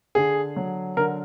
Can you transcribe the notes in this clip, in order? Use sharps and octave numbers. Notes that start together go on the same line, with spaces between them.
D3 G#4
F#3
D3 A#4